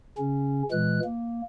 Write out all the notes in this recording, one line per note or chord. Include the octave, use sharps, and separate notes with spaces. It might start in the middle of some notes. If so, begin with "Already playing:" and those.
C#3 C#4
A#2 E3 G#3 F#6
A#3